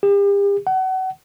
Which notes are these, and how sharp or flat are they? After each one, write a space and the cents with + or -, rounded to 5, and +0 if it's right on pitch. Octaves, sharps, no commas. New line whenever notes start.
G4 +40
F#5 +30